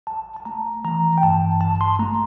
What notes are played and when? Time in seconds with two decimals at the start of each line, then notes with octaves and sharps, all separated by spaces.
0.07 A1 A5
0.36 A5
0.45 A3 A#5
0.84 E3 A#5
1.18 G5
1.23 G2 A5
1.61 A1 A5
1.81 C6
1.99 A3 A#5